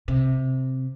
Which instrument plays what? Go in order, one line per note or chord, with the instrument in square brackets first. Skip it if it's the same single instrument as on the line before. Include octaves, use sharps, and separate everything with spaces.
[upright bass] C3